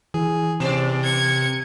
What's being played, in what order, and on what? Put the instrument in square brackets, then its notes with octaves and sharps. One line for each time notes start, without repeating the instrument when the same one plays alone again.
[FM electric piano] E3 [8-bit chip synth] G#4
[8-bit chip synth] C3 [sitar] B3 C#4 D5
[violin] G#6 C#7